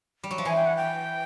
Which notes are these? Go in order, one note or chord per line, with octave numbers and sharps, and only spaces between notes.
G3
F#3
F3
E3 G#5
G5
F#5
G5